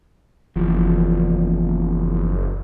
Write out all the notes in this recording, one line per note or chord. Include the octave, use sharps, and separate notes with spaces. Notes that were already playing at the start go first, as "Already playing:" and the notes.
F#1 E2 F3